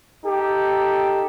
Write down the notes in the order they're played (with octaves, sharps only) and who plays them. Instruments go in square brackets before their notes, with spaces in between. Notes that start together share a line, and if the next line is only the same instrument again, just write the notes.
[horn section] D#4 G4 A4